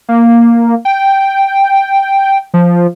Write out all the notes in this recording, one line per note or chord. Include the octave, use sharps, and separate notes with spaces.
A#3
G5
F3